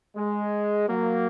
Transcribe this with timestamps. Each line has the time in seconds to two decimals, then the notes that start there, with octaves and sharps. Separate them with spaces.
0.16 G#3
0.89 F#3 A#3